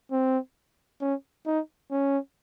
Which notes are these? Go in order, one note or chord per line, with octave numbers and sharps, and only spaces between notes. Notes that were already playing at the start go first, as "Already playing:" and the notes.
C4
C#4
D#4
C#4